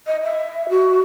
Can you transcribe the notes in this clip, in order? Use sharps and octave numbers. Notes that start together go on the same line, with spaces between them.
D#5
E5
F#4